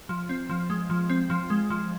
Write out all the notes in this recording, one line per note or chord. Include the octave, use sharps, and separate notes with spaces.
F3
C4
F3
G#3
F3
C4
F3
G#3
F3